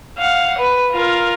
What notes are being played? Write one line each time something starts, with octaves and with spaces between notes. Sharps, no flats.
F5 F#5
B4
F4 A#4